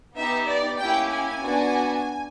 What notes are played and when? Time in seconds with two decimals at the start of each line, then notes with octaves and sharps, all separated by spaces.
0.17 B3 D#4 G4 E5
0.48 D5
0.79 A#3 C#4 E4 G4 G5
1.11 G#5
1.42 B3 D4 F#4